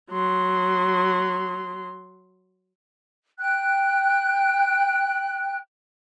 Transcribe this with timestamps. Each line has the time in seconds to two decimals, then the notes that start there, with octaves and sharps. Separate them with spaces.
0.11 F#3 C6
3.39 G5 F#6